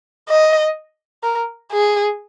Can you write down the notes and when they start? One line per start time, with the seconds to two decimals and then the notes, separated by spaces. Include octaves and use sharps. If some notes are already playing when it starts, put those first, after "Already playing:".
0.29 D#5
1.23 A#4
1.72 G#4